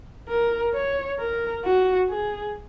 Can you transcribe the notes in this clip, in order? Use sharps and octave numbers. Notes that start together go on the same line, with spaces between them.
A#4
C#5
A#4
F#4
G#4